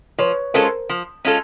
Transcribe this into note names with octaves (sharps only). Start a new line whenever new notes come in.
F3 B4 C#5
G#3 C#4 F4 A4 A#4 C5
F3
G#3 C#4 F4 A4